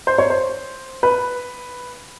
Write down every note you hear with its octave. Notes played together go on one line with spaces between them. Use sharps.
C5
C#5
C5
B4